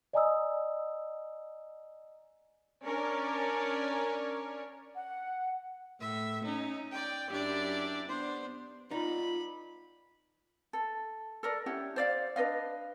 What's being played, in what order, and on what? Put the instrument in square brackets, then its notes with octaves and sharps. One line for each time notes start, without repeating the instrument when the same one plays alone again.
[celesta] D5 D#5 G#5 A#5 D#6 E6
[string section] C#4 D4 A#4 C#5 D5
[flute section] F#5
[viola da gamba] A2 [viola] E5
[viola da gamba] C#4 [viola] D#4
[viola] D5 G5
[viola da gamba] F#2 D4 E4 [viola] G4 D5
[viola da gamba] B3 D4 [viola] C5
[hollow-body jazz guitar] D#4 [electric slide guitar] F4 B4 D5 [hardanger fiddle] B5
[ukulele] A4
A4 A#4 D5
C#4 E4 G4 F#5
C5 D5 F5
D4 B4 D#5 F5